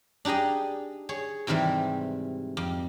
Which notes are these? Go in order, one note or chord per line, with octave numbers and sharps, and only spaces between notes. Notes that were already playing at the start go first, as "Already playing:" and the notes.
D4 D#4 G4 G#4 D#5
G#4 C#5
G#2 C3 D#3 E3 G3
F2